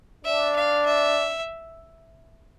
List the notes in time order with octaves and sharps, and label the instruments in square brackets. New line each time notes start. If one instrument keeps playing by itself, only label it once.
[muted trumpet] D4 [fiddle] E5
[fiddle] F5
E5